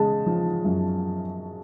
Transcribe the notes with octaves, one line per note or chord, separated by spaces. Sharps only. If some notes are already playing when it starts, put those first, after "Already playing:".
Already playing: C#3 G#3 A5
F3
F#2